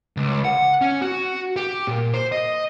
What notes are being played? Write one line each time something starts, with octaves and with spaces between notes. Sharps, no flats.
C#2
F#5
C#4
F#4
G4
A#2
C5
D#5